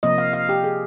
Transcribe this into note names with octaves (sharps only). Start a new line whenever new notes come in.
C3 F3 A#3 D#5
F5
F5
G4
G#4